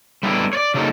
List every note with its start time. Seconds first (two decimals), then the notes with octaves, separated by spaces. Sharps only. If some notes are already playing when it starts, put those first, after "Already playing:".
0.23 G3 A3 B3 D4 E4
0.53 C#5 D5
0.74 C#3 F#3 G3 A#3 D#4 A4